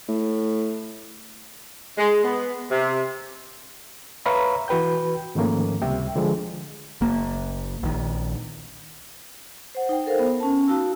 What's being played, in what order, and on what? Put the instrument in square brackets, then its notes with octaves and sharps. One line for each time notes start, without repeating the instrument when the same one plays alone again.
[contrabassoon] A2
[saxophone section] G#3
B3
C3
[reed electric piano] B4 C#5 E5 F5 A#5 B5
E3 F#4 B4 G5 G6
G#2 D#3 F3 A3 A#3 C#4
C#2 C3 G3 E5 G5
D3 F3 G#3
[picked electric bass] F#1 A#3
A#1 D#3
[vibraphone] C5 F#5
D#4 G5
A4 A#4 C5 F5
B3
C#4 A5
D#4 F#4 F5 A5 E6